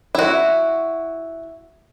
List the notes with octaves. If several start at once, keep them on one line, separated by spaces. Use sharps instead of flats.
E4 F#4